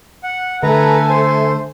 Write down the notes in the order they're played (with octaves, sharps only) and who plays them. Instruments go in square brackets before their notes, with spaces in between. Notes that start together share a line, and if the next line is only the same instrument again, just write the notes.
[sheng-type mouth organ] F#5
[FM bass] D3 [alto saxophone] A3 [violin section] A4 G#5 [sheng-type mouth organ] B4 A#5
[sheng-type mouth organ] C5